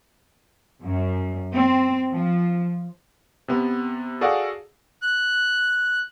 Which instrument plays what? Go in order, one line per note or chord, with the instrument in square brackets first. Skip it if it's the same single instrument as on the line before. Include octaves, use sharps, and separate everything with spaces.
[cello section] F#2
C4
F3
[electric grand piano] C3 B3
F#4 G#4 A4 D5 F5 F#5
[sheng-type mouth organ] F#6